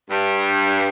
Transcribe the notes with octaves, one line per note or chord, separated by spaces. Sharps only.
G2